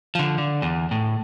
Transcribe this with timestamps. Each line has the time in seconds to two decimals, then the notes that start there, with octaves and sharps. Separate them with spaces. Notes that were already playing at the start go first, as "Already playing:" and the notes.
0.15 D3 F3
0.38 D3
0.62 E2
0.91 A2